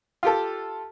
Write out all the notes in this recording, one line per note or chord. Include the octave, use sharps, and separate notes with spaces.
F4 G4 A4